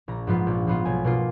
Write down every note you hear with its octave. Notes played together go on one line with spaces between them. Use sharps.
A#1 A#5
G#2 F3 B3 F4
A#1
G#2 F3 B3 F4
B1 G#5
B2 A#3 F4